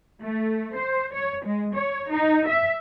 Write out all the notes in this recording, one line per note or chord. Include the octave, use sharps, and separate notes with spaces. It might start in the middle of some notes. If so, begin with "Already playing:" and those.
A3
C5
C#5
G#3
C#5
D#4
E5